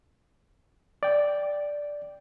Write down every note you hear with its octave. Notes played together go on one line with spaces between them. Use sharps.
D5 G5